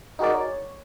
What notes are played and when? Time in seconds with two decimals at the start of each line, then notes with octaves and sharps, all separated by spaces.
0.19 D#4 F#4 G#4 A#4 D5
0.34 C#5